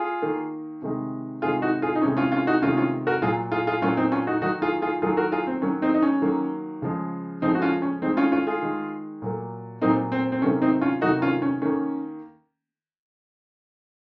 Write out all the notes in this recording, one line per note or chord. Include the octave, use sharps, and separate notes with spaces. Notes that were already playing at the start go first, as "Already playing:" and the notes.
Already playing: F4 G#4
D#3 A#3
C3 D#3 G#3
C3 D#3 G#3 F4 G#4
D#4 F#4
F4 G#4
D#4
C3 D#3 G#3 C#4
C#4 F4
C#4 F4
D#4 F#4
C3 D#3 G#3 C#4 F4
C#4 F4
F#4 A#4
A#2 F#3 A#3 F4 G#4
F4 G#4
F4 G#4
A#2 F#3 A#3 C#4 F4
C4 D#4
C#4 F4
D#4 F#4
D#3 F#3 A#3 D#4 F#4
F4 G#4
F4 G#4
D#3 F#3 A#3 F4 G#4
F#4 A#4
F4 G#4
C4
D#3 F#3 A#3 C#4
C4 D#4
D#4
C#4
D#3 F#3 A#3
C#3 F3 G#3
C#3 F3 G#3 C4 D#4
F#4
C#4 F4
C#4
D#3 G#3 C4 D#4
C#4 F4
C#4 F4
F4 G#4
D#3 G#3
A#2 F#3 A#3
A#2 F#3 A#3 C4 D#4
C4
C4
C3 D#3 F#3 A#3 C#4
C4 D#4
C#4 F4
C3 D#3 F#3 A#3 D#4 F#4
C#4 F4
C#4
D#3 A#3 C#4